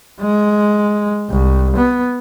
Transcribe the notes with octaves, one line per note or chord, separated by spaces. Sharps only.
G#3
C2
B3